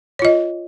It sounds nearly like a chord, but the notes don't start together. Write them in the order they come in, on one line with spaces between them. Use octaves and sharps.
C#5 F4 D#5